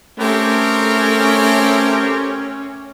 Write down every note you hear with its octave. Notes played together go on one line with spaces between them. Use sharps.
A3 C4 C#4 G4 A#4